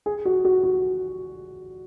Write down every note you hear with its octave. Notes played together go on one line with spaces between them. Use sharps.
G#4
F#4
F#4
F#4